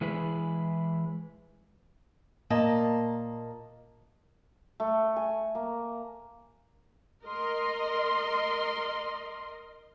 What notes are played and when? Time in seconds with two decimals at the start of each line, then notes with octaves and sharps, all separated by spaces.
0.01 E3 G#3 E4 G#4 B4
2.50 A#2 A#3 D#5 A5
4.80 A3
5.16 G#5
5.55 A#3
7.24 A#4 D#5 C6